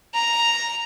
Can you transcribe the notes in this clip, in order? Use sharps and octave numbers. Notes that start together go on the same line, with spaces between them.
A#5